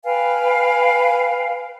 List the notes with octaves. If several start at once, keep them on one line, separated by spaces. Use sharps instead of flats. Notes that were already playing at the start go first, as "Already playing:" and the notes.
B4 F5 G5 G#5